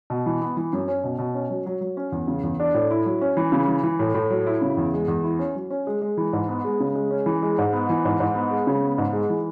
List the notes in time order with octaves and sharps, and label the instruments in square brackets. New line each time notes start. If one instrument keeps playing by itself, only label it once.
[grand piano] B2
E3
B3
E3
F#2
C#4
B2
B2
C#4
F#3
F#3
F#3
C#4
E2
C#3
E2
D4
A2
E4
F#3
C#4
E3
C#3
E3
E3
A2
A2
F#3
E4
C#3
E2
G#3
E2
E4
C#4
F#3
C#4
G#3
G#3
E3
G#2
B3
G#3
C#3
G#3
C#4
E3
G#3
G#2
B3
E3
G#2
G#2
B3
G#3
C#3
B3
G#2
G#3
E3